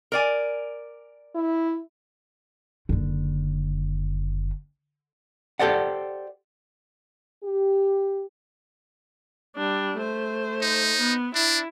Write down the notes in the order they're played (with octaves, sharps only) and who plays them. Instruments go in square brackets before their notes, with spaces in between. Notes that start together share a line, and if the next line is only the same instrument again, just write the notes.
[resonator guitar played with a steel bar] A#4 D5 G#5
[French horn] E4
[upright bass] F#1 D3
[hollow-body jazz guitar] G4 A4 C5 D5 F#5
[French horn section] G4
[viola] G3 D4
A3 C5
[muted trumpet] D#4
[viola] B3
[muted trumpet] D4 [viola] E4